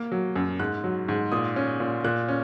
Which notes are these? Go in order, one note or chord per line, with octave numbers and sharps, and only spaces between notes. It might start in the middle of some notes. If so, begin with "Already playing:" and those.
Already playing: A#3
F#3
F#2
G#2 F#6
F#3
G#2
A#2 D#6
C#4
A#2
A#2 F#6
C#4